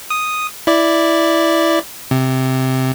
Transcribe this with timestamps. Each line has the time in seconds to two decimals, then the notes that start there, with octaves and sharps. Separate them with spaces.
0.10 D#6
0.67 E4 D5
2.11 C3